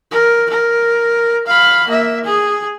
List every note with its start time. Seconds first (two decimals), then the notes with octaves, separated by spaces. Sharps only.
0.11 A#4
0.50 A#4
1.47 F5 B5
1.88 A#3 E5
2.25 G#4